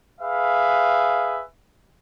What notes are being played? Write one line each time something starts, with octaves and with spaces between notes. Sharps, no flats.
G#4 B4 E5 F5